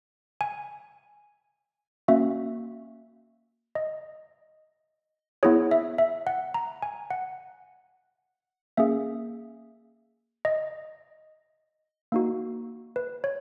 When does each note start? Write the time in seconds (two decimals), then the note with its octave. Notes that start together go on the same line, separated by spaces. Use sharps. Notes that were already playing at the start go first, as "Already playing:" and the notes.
0.41 G#5
2.08 A#3 C#4 F#4 E5
3.75 D#5
5.43 B3 E4 G#4 C#5
5.71 E5
5.98 E5
6.27 F#5
6.54 A#5
6.82 G#5
7.11 F#5
8.77 A#3 C#4 G#4 E5
10.45 D#5
12.12 A#3 D#4 F#4
12.96 B4
13.24 C#5